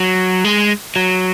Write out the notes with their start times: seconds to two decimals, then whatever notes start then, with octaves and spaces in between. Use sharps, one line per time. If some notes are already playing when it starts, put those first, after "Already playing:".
Already playing: F#3
0.45 G#3
0.96 F#3